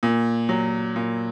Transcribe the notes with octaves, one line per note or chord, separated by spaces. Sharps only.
A#2
F#3
A#2